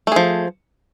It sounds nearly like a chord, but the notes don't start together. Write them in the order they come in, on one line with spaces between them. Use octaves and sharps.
A3 G#4 F3